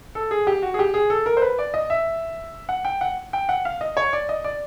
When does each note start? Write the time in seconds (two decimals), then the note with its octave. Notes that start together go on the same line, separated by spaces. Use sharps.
0.15 A4
0.31 G#4
0.47 G4
0.62 F#4
0.74 G#4
0.79 G4
0.94 G#4
1.10 A4
1.26 A#4
1.37 C5
1.42 B4
1.59 D5
1.74 D#5
1.90 E5
2.69 F#5
2.85 G5
3.01 F#5
3.33 G5
3.49 F#5
3.65 F5
3.81 D#5
3.97 C#5
4.13 D5
4.29 D#5
4.44 D5